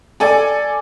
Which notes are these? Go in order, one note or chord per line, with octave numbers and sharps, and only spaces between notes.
A4 D5 G#5